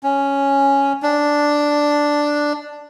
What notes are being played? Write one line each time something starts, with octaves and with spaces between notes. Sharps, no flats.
C#4
D4